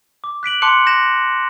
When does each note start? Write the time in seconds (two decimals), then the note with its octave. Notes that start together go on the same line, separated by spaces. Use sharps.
0.24 D6
0.43 F#6 B6 D7 F#7
0.62 A5 C6 D6 F#6 C#7 F7
0.86 G6 A#6 E7